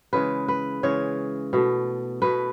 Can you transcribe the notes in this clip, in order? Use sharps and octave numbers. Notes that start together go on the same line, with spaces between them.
C#3 E3 G#3 B4
B4
C#3 E3 G#3 C#5
B2 A3
B2 A3 B4